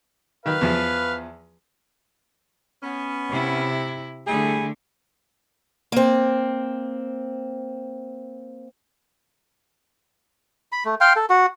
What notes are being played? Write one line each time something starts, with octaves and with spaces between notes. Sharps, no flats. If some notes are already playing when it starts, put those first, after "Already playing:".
D#3 B4 F5
E2 F3
B3 C#4
C3 E4
D3 G3 A3 E4 G#4
A#3 C4
B5
A3
F5 G5 C6
A4
F#4